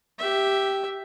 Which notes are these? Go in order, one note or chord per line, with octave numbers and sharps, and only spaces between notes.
G4 E5